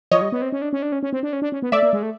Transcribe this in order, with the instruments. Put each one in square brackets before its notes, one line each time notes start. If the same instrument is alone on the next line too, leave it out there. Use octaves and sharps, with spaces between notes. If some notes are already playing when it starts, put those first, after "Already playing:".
[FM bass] F3 [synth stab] C#5 D#5
[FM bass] G3
B3
C4
C#4
D4
C#4
D4
C#4
C#4
C4
D4
C#4
D4
C#4
B3
[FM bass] A3 [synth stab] D5 E5
[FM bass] A#3
G#3
A3